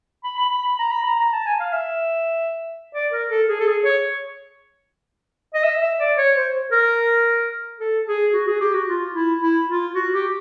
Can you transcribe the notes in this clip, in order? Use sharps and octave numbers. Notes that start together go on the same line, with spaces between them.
B5
B5
B5
B5
A#5
B5
A#5
A#5
A5
G#5
F5
E5
D5
A#4
A4
G#4
A4
G#4
C#5
D#5
E5
E5
D5
C#5
C5
A#4
A4
G#4
F#4
G#4
G4
F#4
F4
E4
E4
F4
F#4
G4